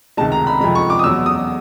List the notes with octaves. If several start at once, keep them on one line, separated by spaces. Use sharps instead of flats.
C#2 C3 D#3 G#3 A5
A#5
B5
F2 C3 F3 G#3 B5
C#6
D6
D#6
E2 B2 F#3 E6
D#6